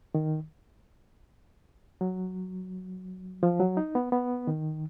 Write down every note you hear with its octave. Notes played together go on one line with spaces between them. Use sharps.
D#3
F#3
F3
F#3
D#4
B3
B3
D#3